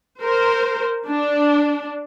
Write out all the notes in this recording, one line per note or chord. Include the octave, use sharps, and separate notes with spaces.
A#4 C5
D4